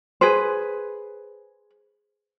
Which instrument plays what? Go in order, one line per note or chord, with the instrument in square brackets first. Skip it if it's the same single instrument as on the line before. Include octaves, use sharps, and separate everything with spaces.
[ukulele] G#4 B4 C5